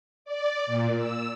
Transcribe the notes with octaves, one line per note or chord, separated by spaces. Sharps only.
D5
A#2
E6